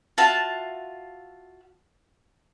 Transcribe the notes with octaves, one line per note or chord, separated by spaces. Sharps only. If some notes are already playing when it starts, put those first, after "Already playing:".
F4 F#4 E5 A5